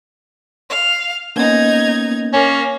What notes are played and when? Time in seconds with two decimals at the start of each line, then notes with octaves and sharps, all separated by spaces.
0.70 F5
1.36 A#3 B3 C#4 D#4 G#6
2.33 A#3 C#4